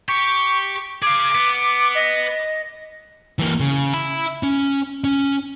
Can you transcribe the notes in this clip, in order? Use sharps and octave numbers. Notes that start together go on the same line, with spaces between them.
G4 C#6
G#4 F5 D6
B3
D#5
E3 A#3
C#3
E5 B5
C#4
C#4